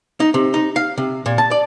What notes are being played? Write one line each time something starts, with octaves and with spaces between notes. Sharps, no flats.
D#4
C3
D#4
F5
C3
A#2
A5
D5